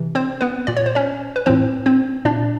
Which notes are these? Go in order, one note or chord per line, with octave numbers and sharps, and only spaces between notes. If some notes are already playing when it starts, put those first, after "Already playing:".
Already playing: C3 E3
C4 C5
B3 B4
A#2 D5
C#5
C5
C#4 C#5
B4
A2 E3 C4 C5
C4 C5
A#2 D4 D5